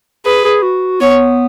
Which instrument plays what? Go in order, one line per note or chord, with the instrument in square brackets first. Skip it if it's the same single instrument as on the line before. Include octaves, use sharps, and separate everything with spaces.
[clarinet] G#4 [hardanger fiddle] B4
[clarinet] G#4
F#4
[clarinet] B3 [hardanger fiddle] C#5